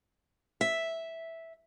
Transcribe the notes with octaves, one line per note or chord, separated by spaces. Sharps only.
E5